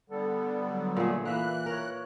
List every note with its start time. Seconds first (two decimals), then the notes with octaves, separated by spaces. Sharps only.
0.10 D3 G3 B3 A4
0.64 F#3
0.97 A#2 A3 G#4
1.25 E3 A#3 E4 E5 F#6
1.66 A#4 C#5